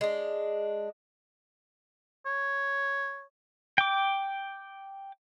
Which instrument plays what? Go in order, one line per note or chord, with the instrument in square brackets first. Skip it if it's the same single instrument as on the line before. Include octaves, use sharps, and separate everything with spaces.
[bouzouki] G#3 D4
[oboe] C#5
[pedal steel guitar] G5 D6